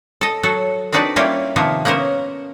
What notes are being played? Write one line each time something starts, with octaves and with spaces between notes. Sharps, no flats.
A4 D#5
F#3 F#4 A4
C4 D4 D#4 F#4 B4 D5
G3 A#3 C#4 E4 F4 G4
C3 D#3 F3 A#3 B3
A#3 B3 C#4 A#4 C5